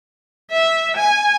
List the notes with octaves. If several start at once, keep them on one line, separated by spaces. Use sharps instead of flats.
E5
G#5